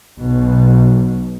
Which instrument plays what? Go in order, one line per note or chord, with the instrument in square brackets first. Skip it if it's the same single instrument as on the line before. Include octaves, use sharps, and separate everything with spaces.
[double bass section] B1 B2